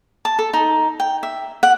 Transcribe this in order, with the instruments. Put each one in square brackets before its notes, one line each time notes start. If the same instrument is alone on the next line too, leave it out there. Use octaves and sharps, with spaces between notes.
[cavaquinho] A5
A4
D#4
G5
E5
F#5